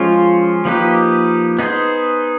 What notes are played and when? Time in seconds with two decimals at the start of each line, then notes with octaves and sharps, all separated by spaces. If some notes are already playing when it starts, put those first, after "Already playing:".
Already playing: F3 G#3 C#4 F4
0.65 F3 A#3 D#4 G4 B4
1.59 B3 D#4 G#4 C5